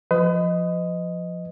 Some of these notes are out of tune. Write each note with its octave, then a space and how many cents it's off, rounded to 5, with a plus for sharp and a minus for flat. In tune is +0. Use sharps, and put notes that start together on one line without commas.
F3 +0 B4 +40 D#5 +0